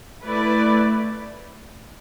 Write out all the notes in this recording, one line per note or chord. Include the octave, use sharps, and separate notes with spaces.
A3 E4 B4 D5